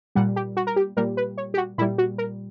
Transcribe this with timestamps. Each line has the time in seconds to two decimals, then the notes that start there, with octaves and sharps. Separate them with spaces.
0.15 A#2 G3 F#5
0.36 G4
0.57 F#4
0.67 A#4
0.76 G4
0.97 A#2 G3 A#4
1.17 B4
1.38 C#5
1.54 G4
1.57 F#4
1.78 A#2 G3 E4
1.98 F#4
2.18 A#4